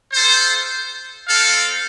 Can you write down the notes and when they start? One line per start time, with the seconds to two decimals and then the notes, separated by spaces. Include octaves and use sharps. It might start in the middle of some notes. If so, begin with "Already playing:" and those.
0.14 F4 A4 C5
1.28 C4 A4 F5